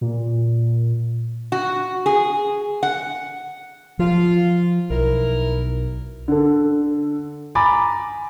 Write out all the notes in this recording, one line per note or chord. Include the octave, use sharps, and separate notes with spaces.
A#2
F#4
G#4
F#5
F3 F4
B1 E4 A#4
D3 A4
G#5 A#5 B5 D6 A6